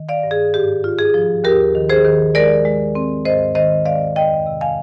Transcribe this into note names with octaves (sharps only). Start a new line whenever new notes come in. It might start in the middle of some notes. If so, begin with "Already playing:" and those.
Already playing: D#3
D5 F5
G2
G#4
G#2 G4
F4
G#4
F3
D#2 G4 A#4
D#3
G#4 C5
D#3
G#3 A#4 D5
G#3
C4
G#2 C5 D#5
D#3 C5 D#5
G#3 D5 F5
F2 D#5 G5
C3
F5 G#5